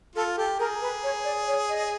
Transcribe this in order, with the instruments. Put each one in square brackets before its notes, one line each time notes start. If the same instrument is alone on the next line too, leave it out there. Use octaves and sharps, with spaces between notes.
[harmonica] F4 [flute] A4
[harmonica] G4 [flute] A4
[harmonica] G#4 [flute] A#4
[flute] B4
C#5
D5
C#5
D#5